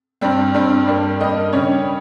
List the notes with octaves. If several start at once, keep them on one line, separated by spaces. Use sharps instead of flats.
G2 G3 C4
G2 G3 C4
G2 G3 A#3
G2 G3 A#3 D#5
C#3 G3 C#4 C#5